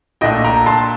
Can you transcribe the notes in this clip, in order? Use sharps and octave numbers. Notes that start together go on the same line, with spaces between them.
A#2 A3 D4 D#5 G5
G5 A#5
A5 C6